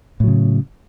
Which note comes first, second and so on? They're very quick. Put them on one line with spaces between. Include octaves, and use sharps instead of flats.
A2 F#3 C#3